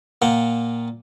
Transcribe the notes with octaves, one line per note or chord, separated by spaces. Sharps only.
A#2 A#3 F#5 G5